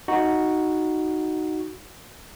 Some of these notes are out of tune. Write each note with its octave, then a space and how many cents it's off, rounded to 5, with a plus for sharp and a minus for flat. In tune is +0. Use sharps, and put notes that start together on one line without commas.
D#4 +0 F#4 +0